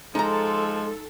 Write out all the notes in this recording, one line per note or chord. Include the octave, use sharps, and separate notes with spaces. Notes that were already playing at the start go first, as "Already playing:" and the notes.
F3 G#3 D#4 A4 A#5